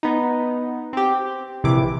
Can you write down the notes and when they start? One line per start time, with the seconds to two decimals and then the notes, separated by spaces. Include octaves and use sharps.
0.03 B3 D#4
0.93 C4 G4
1.64 A#1 C3 E3 D6